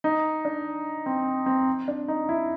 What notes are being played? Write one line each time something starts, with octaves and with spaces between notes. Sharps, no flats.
D#4
D4
C4
C4
D4
D#4
E4